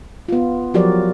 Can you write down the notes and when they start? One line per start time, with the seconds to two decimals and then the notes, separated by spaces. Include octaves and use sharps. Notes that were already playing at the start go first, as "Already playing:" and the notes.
0.29 B3 F4
0.74 F3 F#3 F#4 G4 A#4 D5